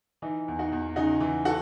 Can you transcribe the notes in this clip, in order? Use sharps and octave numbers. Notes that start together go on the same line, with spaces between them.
E3 D#4
E2
D#4 F#4
E2
C#3 D#4 F#4
E3
F#4 A4